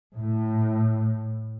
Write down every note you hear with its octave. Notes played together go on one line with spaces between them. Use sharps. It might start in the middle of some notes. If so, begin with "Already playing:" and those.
A2